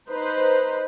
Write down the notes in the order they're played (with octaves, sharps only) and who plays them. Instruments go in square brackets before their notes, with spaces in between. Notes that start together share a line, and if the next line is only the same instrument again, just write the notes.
[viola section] D#4 B4 C5